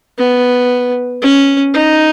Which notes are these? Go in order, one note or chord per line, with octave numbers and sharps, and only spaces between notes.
B3
C#4
D#4